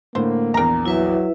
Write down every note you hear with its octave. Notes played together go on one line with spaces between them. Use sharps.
A2 D3 A#3 C5
A#1 E2 A#4 A#5
F#3 E4 B4 E5